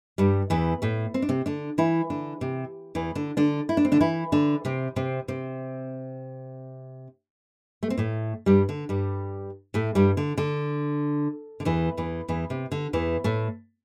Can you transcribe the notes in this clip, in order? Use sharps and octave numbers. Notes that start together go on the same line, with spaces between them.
G2 G3
E2 E3
A2 A3
C4
D4
C3 C4
D3 D4
E3 E4
D3 D4
C3
E2 E3
D3 D4
D3 D4
E4
D4
C4
D3 D4
E3 E4
D3 D4
C3 C4
C3 C4
C3 C4
A3
C4
A2 A3
G2 G3
D3
G2 G3
A2 A3
G2 G3
D3
D3
D3
E2 E3
E2 E3
E2 E3
C3
D3
E2 E3
A2 A3